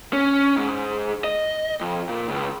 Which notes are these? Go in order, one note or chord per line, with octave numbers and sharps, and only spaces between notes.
C#4
G#2
D#5
F2
A#2
C#2